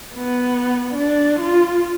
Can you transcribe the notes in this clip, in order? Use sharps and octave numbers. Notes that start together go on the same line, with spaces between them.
B3
D4
F4